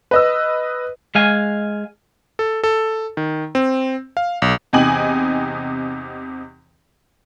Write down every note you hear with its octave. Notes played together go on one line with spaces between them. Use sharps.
B4 D#5 E6
G#3 F5 G#5
A4
A4
D#3
C4
F5
B1
E2 C3 D#4 G5 G#5 F#7